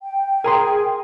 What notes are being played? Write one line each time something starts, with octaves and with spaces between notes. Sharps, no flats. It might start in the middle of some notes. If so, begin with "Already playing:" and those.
G5
G#4 A#4 A#5 C6